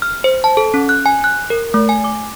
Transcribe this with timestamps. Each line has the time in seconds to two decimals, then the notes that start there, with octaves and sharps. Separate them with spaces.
0.02 F6
0.24 C5
0.44 A5
0.57 A4
0.74 C#4
0.89 F#6
1.06 G#5
1.24 F#6
1.50 A#4
1.74 A3
1.89 G#5
2.04 D6